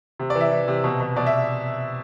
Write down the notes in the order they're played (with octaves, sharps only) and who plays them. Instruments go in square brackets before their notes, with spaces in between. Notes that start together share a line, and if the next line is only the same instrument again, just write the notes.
[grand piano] C3
D5
E3
E5
E3
C3
B2
B2
B2 D5
E5